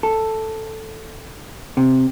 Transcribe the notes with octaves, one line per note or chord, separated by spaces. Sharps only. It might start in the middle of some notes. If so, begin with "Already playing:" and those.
A4
C3